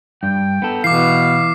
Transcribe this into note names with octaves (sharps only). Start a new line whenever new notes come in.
G2 G5
B3 A4
B2 E3 F5 D6 C7